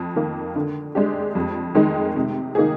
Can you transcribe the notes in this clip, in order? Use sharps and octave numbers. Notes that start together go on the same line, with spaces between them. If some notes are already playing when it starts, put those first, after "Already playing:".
Already playing: F2
D#3 A#3
D3
G#3 D4 G4
F2
D#3 G#3 D#4
C3
D#3 A#3 D#4 G#4